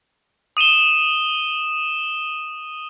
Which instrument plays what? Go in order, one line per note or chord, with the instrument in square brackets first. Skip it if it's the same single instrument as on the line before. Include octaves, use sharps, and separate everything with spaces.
[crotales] D#6 D#7 E7 G7